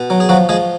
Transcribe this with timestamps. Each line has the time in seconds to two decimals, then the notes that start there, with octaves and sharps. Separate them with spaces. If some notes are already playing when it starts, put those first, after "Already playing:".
Already playing: B2
0.10 F#3
0.20 G#4
0.29 F3 F#3 F#4
0.49 F3 G#3 G#4